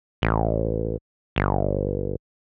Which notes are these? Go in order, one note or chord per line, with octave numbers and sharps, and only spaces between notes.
A1
G1